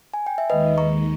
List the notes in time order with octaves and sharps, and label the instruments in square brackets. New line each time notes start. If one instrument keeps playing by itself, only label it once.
[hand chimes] G#5
G5
E5
[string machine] D#2 D#3 G#3 [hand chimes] B4 D#5
[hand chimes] A#5 C#6